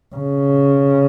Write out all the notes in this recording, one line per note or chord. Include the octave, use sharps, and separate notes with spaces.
C#3